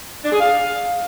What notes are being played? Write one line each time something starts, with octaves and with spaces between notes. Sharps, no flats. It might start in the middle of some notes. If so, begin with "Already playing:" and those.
D4
G#4
F5